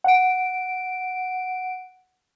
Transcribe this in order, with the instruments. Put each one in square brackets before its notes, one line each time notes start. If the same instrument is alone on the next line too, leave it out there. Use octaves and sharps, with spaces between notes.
[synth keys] F#5 D7